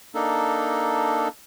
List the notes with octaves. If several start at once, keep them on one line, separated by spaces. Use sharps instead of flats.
A#3 D4 D#4 A4